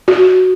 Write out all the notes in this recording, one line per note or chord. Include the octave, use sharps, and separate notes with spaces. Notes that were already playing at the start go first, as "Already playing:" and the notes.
F#4